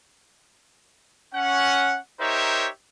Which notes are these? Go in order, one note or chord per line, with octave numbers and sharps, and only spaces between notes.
C#4 F#5
D#4 G4 A#4 C5 C#5 E5